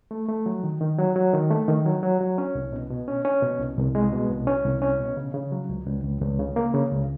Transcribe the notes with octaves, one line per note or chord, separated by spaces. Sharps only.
A3
A3
F#3
D#3
D#3
F#3
F#3
D#3
A3
D#3
F#3
F#3
F#3
C#4
C2
B2
B2
C#4
C#4
B2
C2
C2
G#3
B2
C2
C#4
C2
C#4
B2
C#3
C#3
F#3
C#2
C#2
C#2
C#2
C#3
A#3
C#3
C#2